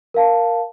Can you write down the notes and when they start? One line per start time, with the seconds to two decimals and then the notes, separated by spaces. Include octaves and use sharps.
0.14 A#4 F5 A5